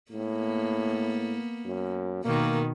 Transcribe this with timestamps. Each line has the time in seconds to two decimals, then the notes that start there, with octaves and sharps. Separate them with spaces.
0.12 A2 A#3 B3
1.65 F#2
2.24 B2 D#3 A#3